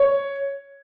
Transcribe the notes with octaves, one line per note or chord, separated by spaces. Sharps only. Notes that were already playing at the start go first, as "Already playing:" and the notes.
Already playing: C#5